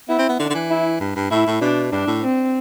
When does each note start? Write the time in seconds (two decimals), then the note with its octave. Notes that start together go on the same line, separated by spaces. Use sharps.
0.09 B3 E4
0.19 C4
0.29 B3
0.39 D3 D4
0.50 D3
0.55 E3
0.70 E4
1.00 G2
1.16 G2
1.31 A2 E4
1.47 A2
1.61 B2 D4
1.92 G2 D4
2.07 A2
2.22 C4